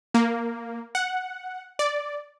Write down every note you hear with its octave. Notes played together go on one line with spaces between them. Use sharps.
A#3
F#5
D5